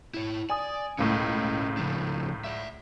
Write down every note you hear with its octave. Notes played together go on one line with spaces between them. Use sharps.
E4 C#5
D5 G#5 D#6
C#2 A2 C#4 A#4 D#5
C#3 F3 D4
D5 E5